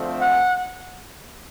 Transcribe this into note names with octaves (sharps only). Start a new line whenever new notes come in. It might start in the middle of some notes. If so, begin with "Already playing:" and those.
Already playing: D3 F3 A3 C4
F#5